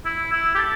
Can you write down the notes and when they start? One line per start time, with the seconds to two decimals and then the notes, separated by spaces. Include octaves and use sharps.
0.05 E4
0.32 E4
0.55 G4
0.58 A4